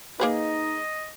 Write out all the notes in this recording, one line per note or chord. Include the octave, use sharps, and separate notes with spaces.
A#3 D#4 G#4 B4 D#5